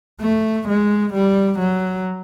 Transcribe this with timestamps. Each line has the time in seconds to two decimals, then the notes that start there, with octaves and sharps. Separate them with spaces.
0.22 A3
0.68 G#3
1.13 G3
1.59 F#3